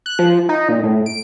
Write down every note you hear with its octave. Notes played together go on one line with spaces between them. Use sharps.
F#6
F3
D#4
A#2
A2
D7